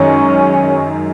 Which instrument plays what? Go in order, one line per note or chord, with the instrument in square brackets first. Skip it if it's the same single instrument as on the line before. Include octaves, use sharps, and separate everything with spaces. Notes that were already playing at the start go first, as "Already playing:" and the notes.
Already playing: [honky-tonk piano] F#2 D#3 G#3 D#4 [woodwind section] C#4